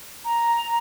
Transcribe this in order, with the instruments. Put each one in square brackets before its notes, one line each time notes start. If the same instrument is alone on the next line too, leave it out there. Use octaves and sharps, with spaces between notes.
[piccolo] A#5